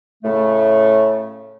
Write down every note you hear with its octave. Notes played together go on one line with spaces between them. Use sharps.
A2 C#3 A3